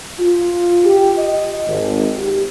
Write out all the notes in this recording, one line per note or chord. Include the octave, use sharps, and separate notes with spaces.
F4
G4
D#5
G#1
G4